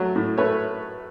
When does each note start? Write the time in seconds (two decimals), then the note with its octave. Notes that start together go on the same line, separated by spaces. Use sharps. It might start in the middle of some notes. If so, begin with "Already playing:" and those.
Already playing: F#3 A3
0.16 A2
0.38 A3 B4 C#5